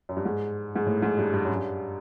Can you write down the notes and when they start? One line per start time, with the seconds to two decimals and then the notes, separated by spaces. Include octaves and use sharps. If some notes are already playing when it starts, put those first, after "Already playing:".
0.09 F#2
0.17 G2
0.25 G#2
0.76 G#2
0.86 A2
1.02 G#2
1.18 G2
1.34 G2
1.45 F#2
1.56 G2